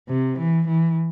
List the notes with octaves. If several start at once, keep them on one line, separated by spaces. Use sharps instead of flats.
C3
E3
E3